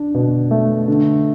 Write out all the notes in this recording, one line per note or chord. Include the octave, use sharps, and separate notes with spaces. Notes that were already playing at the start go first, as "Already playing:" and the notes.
Already playing: D4
B2
A3
D3